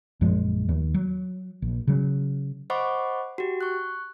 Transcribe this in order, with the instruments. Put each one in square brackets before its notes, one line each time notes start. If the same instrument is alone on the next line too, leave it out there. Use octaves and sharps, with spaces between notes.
[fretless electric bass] A#1 F#2 F3 G#3
D#2
F#3
A#1
C#3 F#3
[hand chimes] C5 D#5 F#5 B5 C#6 D6
F#4 G4
C#6 F#6